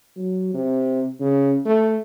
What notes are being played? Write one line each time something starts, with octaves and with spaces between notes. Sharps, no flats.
F#3
C3
C#3
A3